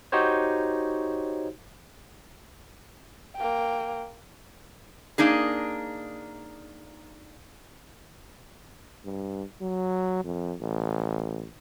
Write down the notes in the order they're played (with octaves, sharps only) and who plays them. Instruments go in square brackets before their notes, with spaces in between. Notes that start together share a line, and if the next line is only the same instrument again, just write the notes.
[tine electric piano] D#4 F#4 G4 C5 C#5
[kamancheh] A#3 G5
[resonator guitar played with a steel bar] A#3 D4 D#4 G#4
[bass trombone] G2
F#3
F2
A1